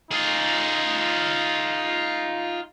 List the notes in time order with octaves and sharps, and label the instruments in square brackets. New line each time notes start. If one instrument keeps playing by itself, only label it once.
[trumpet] D#4 [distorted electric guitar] F4 G#4